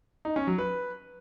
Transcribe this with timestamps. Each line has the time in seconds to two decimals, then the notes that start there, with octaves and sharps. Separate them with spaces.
0.25 D#4
0.36 C#4
0.47 F#3
0.58 B4